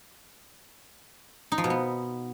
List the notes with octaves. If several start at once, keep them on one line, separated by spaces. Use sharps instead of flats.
D#4
F3
B2
B3